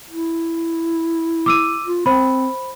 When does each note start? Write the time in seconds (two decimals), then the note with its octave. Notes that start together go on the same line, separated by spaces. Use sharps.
0.10 E4
1.46 D6 E6 D#7
1.85 F4
2.06 C4 C5 B5